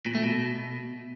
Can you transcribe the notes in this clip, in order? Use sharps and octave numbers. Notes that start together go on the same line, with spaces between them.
A#2
A3
B2